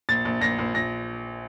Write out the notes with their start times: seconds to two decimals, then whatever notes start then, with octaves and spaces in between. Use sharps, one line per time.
0.09 A#1 A6
0.25 A#1
0.41 A#1 A#6
0.59 A#1
0.74 A#1 A#6